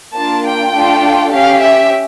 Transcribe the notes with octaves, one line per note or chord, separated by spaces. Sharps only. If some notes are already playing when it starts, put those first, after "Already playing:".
A#3 D4 F4 A5
G5
A3 D4 F4 A4
C#4 G4 F5
E5